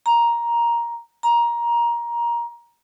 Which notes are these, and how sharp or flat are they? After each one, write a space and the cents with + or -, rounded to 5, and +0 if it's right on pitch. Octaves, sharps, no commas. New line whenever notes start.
A#5 +10
A#5 +15